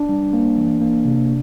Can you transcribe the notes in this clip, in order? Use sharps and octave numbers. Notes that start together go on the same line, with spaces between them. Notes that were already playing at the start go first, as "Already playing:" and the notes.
Already playing: D4
G3
A#3
E3
A#3
C3